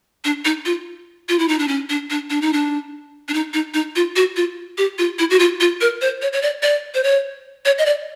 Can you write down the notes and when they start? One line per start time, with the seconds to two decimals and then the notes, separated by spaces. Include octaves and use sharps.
0.25 D4
0.45 D#4
0.65 F4
1.29 F4
1.39 E4
1.48 D#4
1.59 D4
1.68 C#4
1.89 D4
2.10 D4
2.30 D4
2.42 D#4
2.53 D4
3.28 D4
3.34 D#4
3.54 D#4
3.74 D#4
3.96 F4
4.16 F#4
4.36 F4
4.78 G4
4.98 F4
5.19 E4
5.30 F#4
5.39 F4
5.60 F4
5.81 A#4
6.01 C5
6.22 C#5
6.33 C#5
6.42 D5
6.62 D5
6.94 C5
7.04 C#5
7.65 C#5
7.78 D#5
7.86 D5